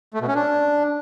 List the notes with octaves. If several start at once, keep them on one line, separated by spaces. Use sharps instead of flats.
A3
B2
C#4
D4